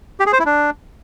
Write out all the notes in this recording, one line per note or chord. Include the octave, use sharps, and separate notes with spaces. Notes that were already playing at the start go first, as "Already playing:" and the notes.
G4
G#4
C5
E4
D4